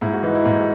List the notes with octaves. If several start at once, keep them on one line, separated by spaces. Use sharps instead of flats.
G#2 E4
F#4
E3 D#4
E4
G#2 F#4